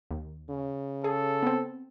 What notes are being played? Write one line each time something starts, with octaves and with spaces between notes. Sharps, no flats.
D#2
C#3
G#4 A4
B3 C4